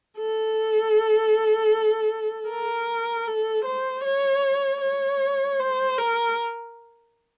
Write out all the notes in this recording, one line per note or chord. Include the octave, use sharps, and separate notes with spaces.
A4
A#4
A4
C5
C#5
C#5
C5
A#4